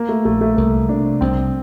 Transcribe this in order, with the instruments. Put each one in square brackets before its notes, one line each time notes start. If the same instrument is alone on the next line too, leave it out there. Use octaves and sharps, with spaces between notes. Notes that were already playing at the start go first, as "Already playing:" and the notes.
Already playing: [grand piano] A#3
A3
[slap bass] A#1 [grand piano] A3
[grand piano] A3
[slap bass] C2 [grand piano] A#3
[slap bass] C3 [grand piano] D4
[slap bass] C2 [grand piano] C4